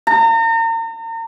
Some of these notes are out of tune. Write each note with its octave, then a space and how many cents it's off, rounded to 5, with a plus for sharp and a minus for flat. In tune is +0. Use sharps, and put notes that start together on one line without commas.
A#5 -40